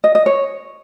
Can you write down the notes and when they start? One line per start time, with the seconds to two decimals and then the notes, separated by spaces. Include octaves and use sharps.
0.04 D#5
0.15 D#5
0.26 C#5